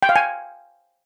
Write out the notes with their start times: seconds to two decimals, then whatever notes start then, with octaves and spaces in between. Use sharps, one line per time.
0.03 G5
0.09 F5
0.16 G#5